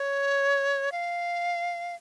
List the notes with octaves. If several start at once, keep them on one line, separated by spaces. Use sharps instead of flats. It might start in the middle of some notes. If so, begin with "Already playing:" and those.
Already playing: C#5
F5